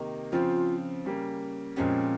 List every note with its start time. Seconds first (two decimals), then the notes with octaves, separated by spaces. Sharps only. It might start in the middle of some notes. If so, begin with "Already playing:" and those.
Already playing: C3 D#3 A#3 D#4
0.32 C#3 F3 C4 F4
1.05 C#3 G3 A#3
1.76 A#2 F3 G#3 C4 C#4 G4